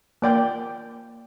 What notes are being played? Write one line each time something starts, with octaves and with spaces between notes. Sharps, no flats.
A#3 D5 G5